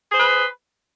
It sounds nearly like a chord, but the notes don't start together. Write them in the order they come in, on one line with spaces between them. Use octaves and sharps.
G#4 C5 B4